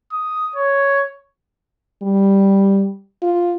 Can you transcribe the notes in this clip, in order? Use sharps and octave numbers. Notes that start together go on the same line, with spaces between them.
D#6
C#5
G3
F4